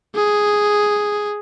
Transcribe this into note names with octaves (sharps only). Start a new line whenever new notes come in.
G#4